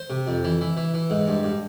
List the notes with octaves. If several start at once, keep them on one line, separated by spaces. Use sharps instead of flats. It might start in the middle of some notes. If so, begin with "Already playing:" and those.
Already playing: C5
C3
F2
E3
E3
E3
E3
G#2
G2
G2